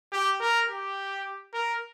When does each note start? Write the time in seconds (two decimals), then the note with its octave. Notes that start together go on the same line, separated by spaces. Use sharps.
0.12 G4
0.41 A#4
0.68 G4
1.54 A#4